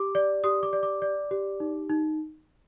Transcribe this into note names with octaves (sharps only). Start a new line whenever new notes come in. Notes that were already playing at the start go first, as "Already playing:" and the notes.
Already playing: G4 D6
D5
G4 D#6
D6
D5
D6
D5
G4
D#4
D#4